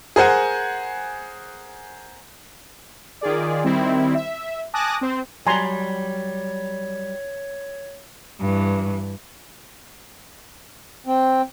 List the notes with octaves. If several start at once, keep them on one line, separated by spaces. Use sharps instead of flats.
G#4 A#4 C5 F#5 G#5
D#3 F4 G#4 D5
D#3 G3 C4 E4
E5
G#5 A5 D6 D#6 F#6 A#6
C4 C5
F#3 G3 C#5 G#5 A#5 C6
G2 E3
C4